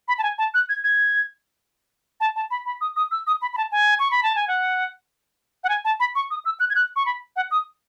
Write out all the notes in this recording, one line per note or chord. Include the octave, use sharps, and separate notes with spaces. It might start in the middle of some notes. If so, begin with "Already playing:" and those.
B5
A5
G#5
A5
F#6
G#6
G#6
A5
A5
B5
B5
D#6
D#6
E6
D#6
B5
B5
A5
G#5
C#6
B5
A5
G#5
F#5
F#5
G#5
A5
B5
C#6
D#6
E6
F#6
G#6
F#6
C#6
B5
F#5
D#6